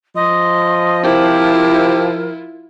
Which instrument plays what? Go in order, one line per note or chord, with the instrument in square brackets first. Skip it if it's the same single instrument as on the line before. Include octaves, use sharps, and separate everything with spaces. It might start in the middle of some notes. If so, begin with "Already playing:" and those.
[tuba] F3 [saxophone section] D#5 [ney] C6
[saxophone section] C3 C4 G4 [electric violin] E4 F4 [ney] A#4